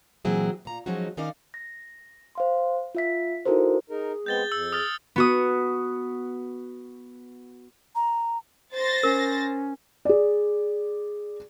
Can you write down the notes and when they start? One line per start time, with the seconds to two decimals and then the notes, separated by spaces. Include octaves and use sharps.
0.25 A#2 E3 F#3 C4 E4 G#4
0.65 A#2 A#5
0.86 F3 F#3 G#3 C#4 D#4 F#4
1.17 D#3 C#4 D#4 A#4 D5 F5
1.54 A#6
2.35 C5 F5 C6
2.95 F4 E5 B6
3.45 D#4 E4 F#4 A4 A#4 C5
3.90 D#4 G#4 A#4
4.26 G#3 B3 C4 G6 A6 G7
4.52 F2 E6
4.72 D#6 F6 A6
5.16 B3 F#4 D#6
7.95 A#5
8.74 C5 A6 A#6
9.03 C#4 A#4
10.05 G#4 D5